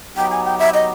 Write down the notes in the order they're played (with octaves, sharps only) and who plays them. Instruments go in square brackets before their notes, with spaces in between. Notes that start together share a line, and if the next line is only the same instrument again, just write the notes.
[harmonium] F#3 B3 D#4 G4 [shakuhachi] G5
[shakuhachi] G#5
G5
E5
D#5